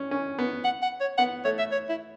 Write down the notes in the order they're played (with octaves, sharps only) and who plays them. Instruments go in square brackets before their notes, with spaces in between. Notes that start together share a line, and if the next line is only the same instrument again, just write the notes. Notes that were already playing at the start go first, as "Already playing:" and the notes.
Already playing: [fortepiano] C#4
C#4
B3
[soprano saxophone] F#5
F#5
C#5
[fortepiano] B3 [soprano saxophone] F#5
[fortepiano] A3 [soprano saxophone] C#5
[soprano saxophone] E5
C#5
E4